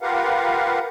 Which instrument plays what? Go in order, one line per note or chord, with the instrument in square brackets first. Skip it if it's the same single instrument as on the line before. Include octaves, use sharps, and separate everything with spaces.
[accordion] F4 G4 A#4 B4 F5 F#5